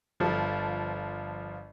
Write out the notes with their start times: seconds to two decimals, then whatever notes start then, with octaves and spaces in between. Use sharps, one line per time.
0.20 G1 F3 A4